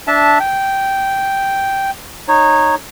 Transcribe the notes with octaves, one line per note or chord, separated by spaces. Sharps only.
D4 E5 A5
G5
D#4 C#5